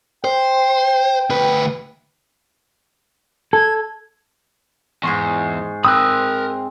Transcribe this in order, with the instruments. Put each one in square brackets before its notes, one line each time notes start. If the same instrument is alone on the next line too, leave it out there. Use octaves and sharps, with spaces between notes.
[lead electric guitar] C5 [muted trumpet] G5
[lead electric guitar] D2 B4
[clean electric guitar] A4 [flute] G#6
[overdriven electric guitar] E2 [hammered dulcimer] G#2 C6 C#6
[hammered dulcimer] C4 [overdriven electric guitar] A#4 B5 [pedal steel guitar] D#6 E6 F#6